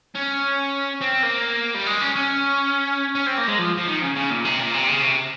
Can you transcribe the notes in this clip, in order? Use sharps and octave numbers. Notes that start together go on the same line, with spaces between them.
C#4
C4
A#3
G3
G#3
C#4
C#4
C#4
C4
A#3
G#3
F3
F3
D#3
C#3
C#3
A#2
C3
A#2
C3
C#3
C3